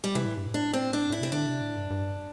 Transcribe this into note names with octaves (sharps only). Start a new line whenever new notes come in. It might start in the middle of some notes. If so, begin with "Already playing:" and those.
G3
C3 E3
A2
G2
A2
D4
C4
D4
A2 E4
C3 C4
D3 D4
C3
A2
G2
G2